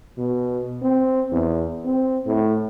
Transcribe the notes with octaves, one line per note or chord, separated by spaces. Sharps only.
B2
C4
E2
C4
A2